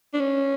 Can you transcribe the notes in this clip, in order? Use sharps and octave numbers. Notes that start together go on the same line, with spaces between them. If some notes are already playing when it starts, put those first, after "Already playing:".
D4
C#4